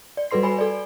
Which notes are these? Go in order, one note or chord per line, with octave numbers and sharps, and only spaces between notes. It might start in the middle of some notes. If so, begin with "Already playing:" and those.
D5
G3 F#4 A4 B4 C6 C7
B4 G#5 B5
A4 D5